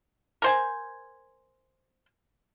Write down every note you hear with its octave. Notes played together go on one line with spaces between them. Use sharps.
A#4 C5 G#5